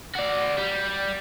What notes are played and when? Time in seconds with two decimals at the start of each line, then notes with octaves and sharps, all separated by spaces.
0.15 F#4 D5
0.58 G3